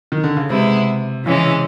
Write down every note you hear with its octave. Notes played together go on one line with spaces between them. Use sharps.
D#3
D3
C#3
C3 G#3 B3 E4
C#3 E3 G#3 C#4